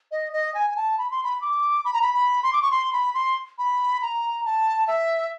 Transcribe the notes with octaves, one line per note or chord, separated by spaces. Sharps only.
D#5
D#5
G#5
G#5
A5
B5
C6
B5
D6
B5
A#5
B5
B5
C6
D6
C#6
C6
B5
C6
B5
A#5
A5
E5